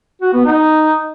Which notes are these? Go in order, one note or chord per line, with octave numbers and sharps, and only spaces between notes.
F#4
B3
D#4